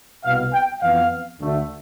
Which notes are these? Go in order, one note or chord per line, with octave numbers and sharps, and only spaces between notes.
C2 B2 B3 F5
G5
F2 E3 B3 F5
D2 D3 A3